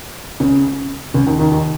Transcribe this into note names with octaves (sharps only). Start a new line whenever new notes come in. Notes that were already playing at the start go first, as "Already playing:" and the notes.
C#2 C#3
C#2 C#3
D#2 D#3
D#2 D#3
D#2 D#3